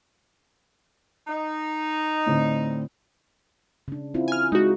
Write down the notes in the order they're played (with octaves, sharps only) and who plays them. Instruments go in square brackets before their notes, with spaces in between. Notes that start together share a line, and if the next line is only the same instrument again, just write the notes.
[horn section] D#4
[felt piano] A2 D3 C4
[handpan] C#3 D4
C4 E4 F4
[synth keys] G#5 F6
[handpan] G#3 [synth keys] D#4 F#4